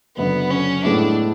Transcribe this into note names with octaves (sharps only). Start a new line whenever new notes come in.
F#1 F#2 D3 B3
C#4
A2 G#3 B3 D4 E4